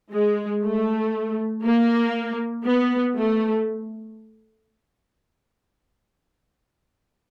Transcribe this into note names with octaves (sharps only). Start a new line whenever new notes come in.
G#3
A3
A#3
B3
A3